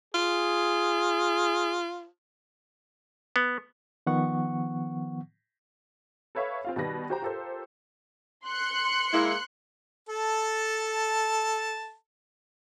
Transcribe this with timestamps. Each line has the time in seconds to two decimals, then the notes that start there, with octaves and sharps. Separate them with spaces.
0.14 F4 G#4
3.36 B3
4.07 D#3 F3 B3 F#5 C#6
6.35 A4 B4 C#5 E5 F5 C#6
6.65 C4 F4 F5
6.76 B2 D#3 G3 B4 A#6
7.10 F#4 G4 C5 G5 A#5
7.22 F4 G4 A4 A#4 C5
8.46 C6 F#6 C#7
9.13 G#3 A#3 E4
10.09 A4 A5